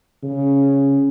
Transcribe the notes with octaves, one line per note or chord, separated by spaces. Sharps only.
C#3